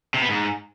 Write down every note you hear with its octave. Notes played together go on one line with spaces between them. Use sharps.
C3
B3
G#2